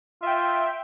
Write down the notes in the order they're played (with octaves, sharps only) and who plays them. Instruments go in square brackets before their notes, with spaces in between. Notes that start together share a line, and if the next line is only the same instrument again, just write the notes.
[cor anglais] F4 [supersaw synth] E5 G5